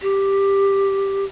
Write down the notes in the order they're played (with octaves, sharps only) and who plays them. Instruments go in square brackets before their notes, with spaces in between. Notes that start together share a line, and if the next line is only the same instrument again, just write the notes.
[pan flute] G4